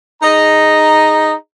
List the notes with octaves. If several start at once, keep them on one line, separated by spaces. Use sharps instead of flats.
D#4 G#4 D#5 A#5